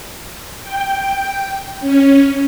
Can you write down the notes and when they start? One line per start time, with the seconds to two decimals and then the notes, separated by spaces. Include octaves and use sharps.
0.62 G5
1.80 C#4